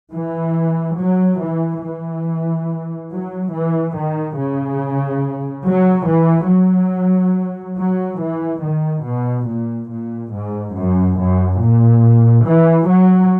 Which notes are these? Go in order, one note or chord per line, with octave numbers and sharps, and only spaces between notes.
E3
F#3
E3
E3
F#3
E3
D#3
C#3
F#3
E3
F#3
F#3
E3
D#3
B2
A#2
A#2
G#2
F#2
F#2
A#2
E3
F#3